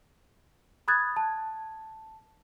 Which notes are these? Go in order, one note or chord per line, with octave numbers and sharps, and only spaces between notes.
B5 D#6 F#6 G#6 A6
A5